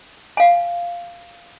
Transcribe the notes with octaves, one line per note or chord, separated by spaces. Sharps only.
F5 G#5